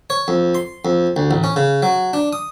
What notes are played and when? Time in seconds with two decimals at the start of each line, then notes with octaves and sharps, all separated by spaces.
0.10 C#5
0.28 F2
0.55 C6
0.85 F2
1.16 D2
1.31 A1
1.44 C#4
1.56 C#3
1.83 F#3
2.13 D4
2.33 D#6